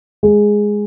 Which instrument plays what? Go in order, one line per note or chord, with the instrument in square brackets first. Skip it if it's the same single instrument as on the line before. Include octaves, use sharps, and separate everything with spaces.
[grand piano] G#3